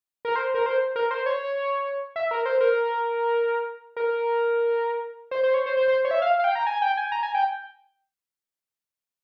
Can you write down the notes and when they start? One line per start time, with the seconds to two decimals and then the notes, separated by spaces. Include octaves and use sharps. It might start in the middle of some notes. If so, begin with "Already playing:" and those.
0.25 A#4
0.36 C5
0.54 A#4
0.66 C5
0.96 A#4
1.11 C5
1.26 C#5
2.16 E5
2.31 A#4
2.46 C5
2.61 A#4
3.96 A#4
5.31 C5
5.43 C5
5.54 C#5
5.66 C5
5.77 C5
5.88 C5
6.05 C#5
6.11 E5
6.22 F5
6.39 F5
6.44 G5
6.55 A#5
6.67 G#5
6.82 G5
6.97 G#5
7.12 A#5
7.23 G#5
7.35 G5